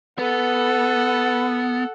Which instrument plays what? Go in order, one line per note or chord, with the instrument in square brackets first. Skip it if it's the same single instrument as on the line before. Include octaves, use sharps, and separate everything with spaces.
[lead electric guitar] B3 [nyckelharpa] A4 F#5